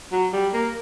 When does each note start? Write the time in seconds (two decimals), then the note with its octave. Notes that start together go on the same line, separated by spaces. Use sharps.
0.12 F#3
0.33 G3
0.54 A#3